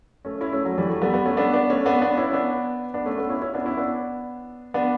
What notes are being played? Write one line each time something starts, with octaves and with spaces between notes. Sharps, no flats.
A3 C#4
C#4 E4
A3 C#4
F#3
A3
E3 G3
F#3 A3
G3 B3
G3 B3
A3 C#4
B3 D4
B3 D4
A3 C#4
B3 D4
B3 D4
C#4 E4
B3 D4
B3 D4
A3 C#4
B3 D4
C#4 E4
C#4 E4
B3 D4
C#4 E4
B3 D4
B3 D4